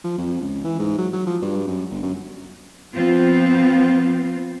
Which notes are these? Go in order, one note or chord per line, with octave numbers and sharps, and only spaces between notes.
F3
F2
C#2
E3
G#2
F#3
F#3
F3
G2
F#2
G1
F#2
F3 B3 C4 F4